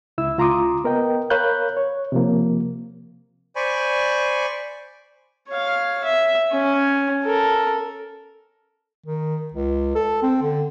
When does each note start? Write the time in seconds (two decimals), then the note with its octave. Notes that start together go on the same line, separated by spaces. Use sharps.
0.18 C#2 E4 E6
0.38 C#2 F4 A#5 C6 D6 D#6
0.84 B3 A#4 D#5 G5
1.30 A#4 C#5 F5 B5 F#6 G6
1.77 C#5
2.12 C3 F3 A#3
3.56 C5 D5 G#5 B5 C#6
5.49 C#5 F5
6.05 E5
6.53 C#4
7.24 A4 A#4
9.06 D#3
9.53 C#2
9.95 A4
10.23 C4
10.42 D3